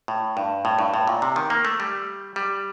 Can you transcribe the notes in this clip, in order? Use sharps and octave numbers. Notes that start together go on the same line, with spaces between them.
A2
G2
A2
G2
A2
A#2
C3
D#3
A#3
A3
G3
G3